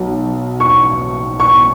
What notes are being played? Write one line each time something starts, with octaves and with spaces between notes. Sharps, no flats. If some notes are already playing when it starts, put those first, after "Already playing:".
Already playing: B1 B2
C#6
C#6